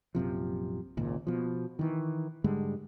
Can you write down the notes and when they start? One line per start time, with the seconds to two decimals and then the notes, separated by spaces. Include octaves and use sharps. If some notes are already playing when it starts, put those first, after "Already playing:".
0.15 A#1 F#2 C3 F3
0.97 G#1 C#2 A#2
1.27 B2 F3
1.79 D#3 E3
2.44 G#2 D3 G3 G#3